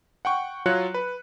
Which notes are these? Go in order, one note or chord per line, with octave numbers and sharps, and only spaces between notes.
F#5 G5 C#6
F#3 F4 C#5 F#6 C#7
B4